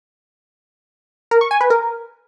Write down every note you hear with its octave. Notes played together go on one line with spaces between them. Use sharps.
A#4
C#6
G#5
B4
A#4